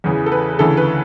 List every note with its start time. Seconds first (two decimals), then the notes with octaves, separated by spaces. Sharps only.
0.04 E2 C#3 E3
0.26 A4
0.32 B4
0.59 D2 C#3 E3 A4
0.77 B4